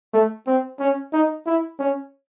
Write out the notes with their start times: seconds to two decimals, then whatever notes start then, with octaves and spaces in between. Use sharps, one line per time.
0.14 A3
0.47 C4
0.79 C#4
1.13 D#4
1.46 E4
1.79 C#4